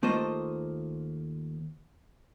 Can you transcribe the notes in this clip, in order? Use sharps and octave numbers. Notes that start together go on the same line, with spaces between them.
D#2 A3 A#3 F4 C5 D#5